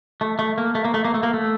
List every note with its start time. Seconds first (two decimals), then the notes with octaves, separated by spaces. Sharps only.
0.21 A3
0.39 A3
0.58 A#3
0.75 A3
0.85 A#3
0.94 A3
1.05 A#3
1.14 A3
1.23 A#3
1.34 A3